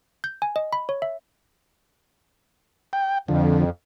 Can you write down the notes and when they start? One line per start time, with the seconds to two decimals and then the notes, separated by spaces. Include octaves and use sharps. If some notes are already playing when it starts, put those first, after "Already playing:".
0.24 G6
0.42 G#5
0.56 D#5
0.73 B5
0.89 C#5
1.02 E5
2.93 G5
3.28 F2 D3 F3